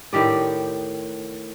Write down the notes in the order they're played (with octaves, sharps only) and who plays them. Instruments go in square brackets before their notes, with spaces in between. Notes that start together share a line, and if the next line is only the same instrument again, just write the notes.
[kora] A2 D#3 G4 D5